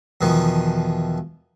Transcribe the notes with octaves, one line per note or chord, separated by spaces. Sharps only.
E2 B2 D#3 F3